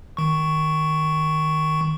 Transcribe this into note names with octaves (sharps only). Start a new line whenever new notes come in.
D#3 C#6